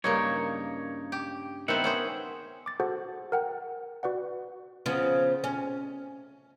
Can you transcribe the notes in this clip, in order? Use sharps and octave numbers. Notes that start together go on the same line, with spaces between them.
G2 C#3 A#3 D#4 C#5
G4
D#3 B3 C4 E5 F#5
C#4 G#4 C5
D6 A6
F#4 G#4 A4 C5 F#5
A#4 F#5 G5
F#4 B4 D5 F#5
C#3 F3 B3
C#4